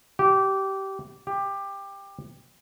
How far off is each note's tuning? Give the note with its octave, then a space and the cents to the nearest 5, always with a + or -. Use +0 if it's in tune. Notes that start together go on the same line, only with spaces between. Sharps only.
G4 -20
G4 +15